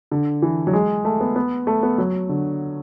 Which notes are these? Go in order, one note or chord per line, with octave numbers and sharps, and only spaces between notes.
D3
E3
F#3
G#3
A3
B3
B3
A3
B3
F#3
D3